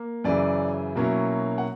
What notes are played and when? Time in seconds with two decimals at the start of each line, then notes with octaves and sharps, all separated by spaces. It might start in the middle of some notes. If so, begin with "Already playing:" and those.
Already playing: A#3
0.24 F#2 C#3 E3 D5
0.96 B2 F#3 A#3 C#4 E4
1.58 F#5